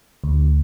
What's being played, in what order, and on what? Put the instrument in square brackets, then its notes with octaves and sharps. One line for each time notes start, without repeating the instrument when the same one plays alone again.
[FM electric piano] D2